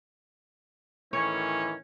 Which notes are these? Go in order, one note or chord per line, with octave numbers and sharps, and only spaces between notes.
A2 D#3 E3 C#4 C#5